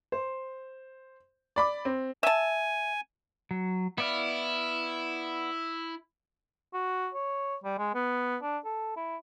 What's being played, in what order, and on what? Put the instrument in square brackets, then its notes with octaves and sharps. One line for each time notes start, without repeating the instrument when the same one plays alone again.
[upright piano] C5
D5 B5 D6
C4
[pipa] E5 A5 [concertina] G#5
[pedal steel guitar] F#3
[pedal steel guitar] B3 D5 F5 [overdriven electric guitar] E4
[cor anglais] F#4
C#5
G3
G#3
B3
D4
A4
E4